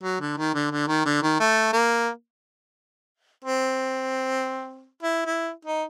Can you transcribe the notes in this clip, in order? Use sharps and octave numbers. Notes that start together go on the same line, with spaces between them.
F#3
D3
D#3
D3
D3
D#3
D3
D#3
A3
A#3
C4
E4
E4
D#4